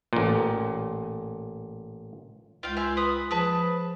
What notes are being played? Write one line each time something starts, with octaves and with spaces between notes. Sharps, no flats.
A1 A#2
C#2 F4 F5 G5
G#4 E5 C6
B4 D#6
F3 G#4 B4 A5